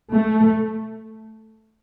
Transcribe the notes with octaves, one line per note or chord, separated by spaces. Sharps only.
A3